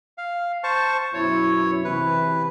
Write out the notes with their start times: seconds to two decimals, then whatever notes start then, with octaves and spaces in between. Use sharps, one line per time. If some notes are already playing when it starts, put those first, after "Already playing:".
0.18 F5
0.64 C5 A5 C#6
1.14 F#2 B2 E4 C#5
1.85 C3 E3 B4